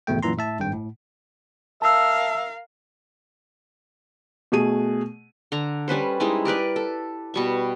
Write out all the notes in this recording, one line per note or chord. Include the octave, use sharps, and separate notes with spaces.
G#1 E2 B2 A3 G5
F#2 A#2 E3 A#5 C6
A2 E5 A5
G#1 G2 G5
A2
A#4 E5 F5 A5 E6
B2 A3 G#4 D#7
D3 A#5
G3 C#4 B4 C5
G3 G#3 D#4 E4
G4 A#4 B4 D5
A4
B2 G3 C#6